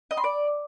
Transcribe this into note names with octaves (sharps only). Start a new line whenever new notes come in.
D#5
C6
D5